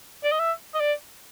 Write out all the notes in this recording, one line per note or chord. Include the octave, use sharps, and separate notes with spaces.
D5
D#5
E5
D#5
D5